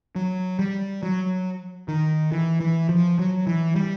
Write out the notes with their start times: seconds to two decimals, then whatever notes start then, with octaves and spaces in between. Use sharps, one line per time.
0.16 F#3
0.59 G3
1.03 F#3
1.88 D#3
2.32 E3
2.61 E3
2.89 F3
3.19 F#3
3.47 E3
3.76 G3